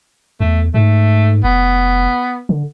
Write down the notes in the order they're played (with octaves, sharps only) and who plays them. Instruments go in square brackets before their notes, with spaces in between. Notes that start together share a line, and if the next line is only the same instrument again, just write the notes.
[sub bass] E2 [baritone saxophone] A3
[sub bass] G#2 [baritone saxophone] A3
[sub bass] F1 [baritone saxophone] B3
[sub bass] D3